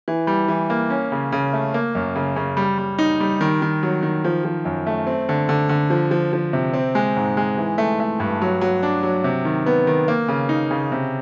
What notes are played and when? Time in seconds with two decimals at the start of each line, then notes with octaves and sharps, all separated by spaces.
0.08 E3
0.27 G3
0.49 E3
0.70 A#3
0.90 C#4
1.12 C#3
1.32 C#3
1.53 A3
1.74 A#3
1.95 F#2
2.16 C#3
2.36 C#3
2.57 G3
2.78 G3
2.99 D#4
3.20 G3
3.41 D#3
3.62 D#3
3.83 F#3
4.03 D#3
4.24 F3
4.45 F3
4.65 F#2
4.87 A3
5.07 C4
5.29 D3
5.49 D3
5.69 D3
5.90 F3
6.11 F3
6.33 F3
6.53 C3
6.74 C4
6.95 G#3
7.16 G#2
7.37 G#3
7.57 E3
7.78 A3
8.00 A3
8.20 G2
8.42 F#3
8.61 F#3
8.83 D4
9.03 F#3
9.24 C3
9.45 D#3
9.66 B3
9.87 D#3
10.08 A#3
10.28 C#3
10.49 D#4
10.71 C#3
10.92 C3